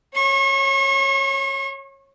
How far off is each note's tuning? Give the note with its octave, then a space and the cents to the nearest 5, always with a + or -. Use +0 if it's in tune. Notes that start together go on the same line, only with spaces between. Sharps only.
C#5 -15 C#6 -40